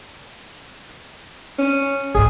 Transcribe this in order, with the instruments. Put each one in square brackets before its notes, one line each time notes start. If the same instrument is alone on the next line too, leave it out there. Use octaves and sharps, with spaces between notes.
[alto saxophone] C#4
[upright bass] G#1 G#2 [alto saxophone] G#4